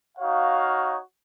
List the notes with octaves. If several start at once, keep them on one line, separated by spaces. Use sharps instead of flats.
D#4 F#4 C#5 F5